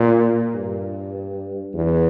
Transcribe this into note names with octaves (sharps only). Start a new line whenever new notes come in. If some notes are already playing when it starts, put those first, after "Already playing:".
Already playing: A#2
G2
E2